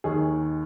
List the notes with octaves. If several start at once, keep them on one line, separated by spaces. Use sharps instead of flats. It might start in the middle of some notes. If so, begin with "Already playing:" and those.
D#2 D#3 G#4